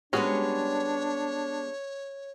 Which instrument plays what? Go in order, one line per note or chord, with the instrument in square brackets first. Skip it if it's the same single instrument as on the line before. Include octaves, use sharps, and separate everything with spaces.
[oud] G3 G#3 B3 [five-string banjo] C#4 F#4 G#4 [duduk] D4 [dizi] C#5